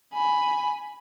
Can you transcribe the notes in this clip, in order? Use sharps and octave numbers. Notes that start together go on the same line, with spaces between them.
G#5 B5